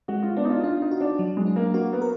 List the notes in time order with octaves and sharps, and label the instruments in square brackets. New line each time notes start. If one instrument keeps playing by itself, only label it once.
[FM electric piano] G#3 [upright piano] F#4
[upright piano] F4
[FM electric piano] B3 [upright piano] D4
[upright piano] D#4
F4
[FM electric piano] D4 [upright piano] F4
[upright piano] D#4
[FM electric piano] F#4
[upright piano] D4
[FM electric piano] F#3
[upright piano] G#3
[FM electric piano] D4
[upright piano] A#3
[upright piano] A#3 [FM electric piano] F#4
[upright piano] B3
[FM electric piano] A#4